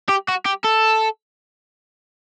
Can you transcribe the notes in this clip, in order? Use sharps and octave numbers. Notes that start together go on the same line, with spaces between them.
G4
F#4
G4
A4